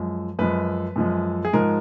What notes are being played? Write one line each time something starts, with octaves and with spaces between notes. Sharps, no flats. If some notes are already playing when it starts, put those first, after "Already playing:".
Already playing: F#2 F3 G#3
F#2 F3 G#3 B4
F#2 F3 G#3
G#4
G#2 F3 G#3 A#4